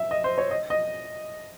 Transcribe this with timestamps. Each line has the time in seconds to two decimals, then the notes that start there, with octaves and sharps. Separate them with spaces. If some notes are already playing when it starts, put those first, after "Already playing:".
Already playing: E5
0.11 D#5
0.24 C5
0.38 C#5
0.51 D#5
0.70 D#5